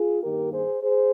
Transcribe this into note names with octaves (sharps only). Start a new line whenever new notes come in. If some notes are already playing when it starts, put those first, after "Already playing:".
Already playing: F4 G#4
G2 D#3 A#3 D#4 G4 A#4
G#4 C5
G#4 C5